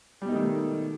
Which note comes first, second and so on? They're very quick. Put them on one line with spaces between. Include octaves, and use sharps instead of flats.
G3 B2 D#4 A3 D#3